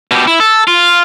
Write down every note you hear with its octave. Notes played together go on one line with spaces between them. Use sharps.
B2 G4
E4
A4
F4